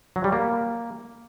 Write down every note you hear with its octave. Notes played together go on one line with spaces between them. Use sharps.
F#3
G3
A#3